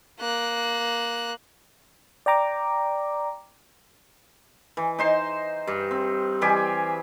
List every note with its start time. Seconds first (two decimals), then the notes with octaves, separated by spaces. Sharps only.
0.20 A#3 F#6
2.26 D5 G5 A#5 D6
4.77 E3
4.99 D#4 C5 C6
5.67 G2
5.91 C4
6.41 E3 G3 G4 G#4